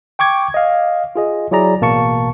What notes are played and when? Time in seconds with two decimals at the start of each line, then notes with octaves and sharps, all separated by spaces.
0.19 G5 C#6 D6 G#6
0.54 D#5 F5
1.16 F4 G#4 D#5
1.51 F#3 E4 G#4 D5 A#5
1.81 A1 B2 A#3 A5 C#6 C#7